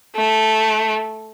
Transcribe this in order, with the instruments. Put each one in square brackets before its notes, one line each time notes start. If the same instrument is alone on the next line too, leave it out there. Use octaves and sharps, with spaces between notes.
[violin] A3